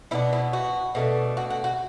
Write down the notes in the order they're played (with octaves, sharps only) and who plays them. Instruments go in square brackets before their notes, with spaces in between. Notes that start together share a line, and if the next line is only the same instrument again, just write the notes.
[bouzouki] B2 B3 D4 E4
E4
F#4
B2 A3 D4
F#4
F#4
F#4